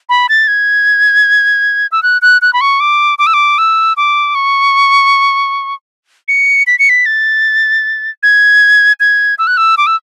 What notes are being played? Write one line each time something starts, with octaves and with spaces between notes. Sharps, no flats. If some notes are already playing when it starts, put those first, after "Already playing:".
B5
A6
G#6
E6
F#6
F#6
F#6
B5
C#6
D6
D6
E6
D6
E6
D6
C#6
C#7
B6
C#7
B6
A6
G#6
G#6
E6
F#6
E6
D6
E6